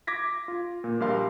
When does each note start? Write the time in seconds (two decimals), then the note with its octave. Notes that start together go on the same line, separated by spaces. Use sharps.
0.07 D6 G#6 A#6 B6
0.48 F4
0.84 A#2
1.00 A#1 G3 A#4 F5 C6